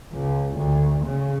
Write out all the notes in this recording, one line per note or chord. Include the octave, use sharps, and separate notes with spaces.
C#2
D2
C#3